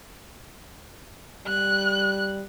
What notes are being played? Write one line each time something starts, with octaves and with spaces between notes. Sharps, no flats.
G3 F#6